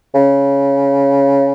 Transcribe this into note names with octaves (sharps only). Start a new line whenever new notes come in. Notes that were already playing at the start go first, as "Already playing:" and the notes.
C#3